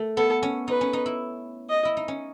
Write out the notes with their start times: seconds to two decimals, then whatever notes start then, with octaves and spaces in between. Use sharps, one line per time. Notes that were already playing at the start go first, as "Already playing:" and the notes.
Already playing: A3
0.17 B3 A4
0.43 C#4
0.68 D#4 B4
0.81 C#4
0.93 D#4
1.06 E4
1.70 D#5
1.85 E4
1.97 D#4
2.08 C#4